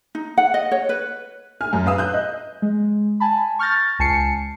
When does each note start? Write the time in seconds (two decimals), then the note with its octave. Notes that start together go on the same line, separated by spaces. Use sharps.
0.15 D#4
0.38 F#5
0.54 D#5
0.72 C#5
0.89 B4
1.61 G#5 F6
1.73 F#2
1.86 B4 F5 D#6 E6
1.98 F#6 G6
2.14 D#5
2.62 G#3
3.20 G#5 A5 B5
3.59 C#6 F6 G6 A6 A#6
3.99 C#2 G#5 A5 C7 C#7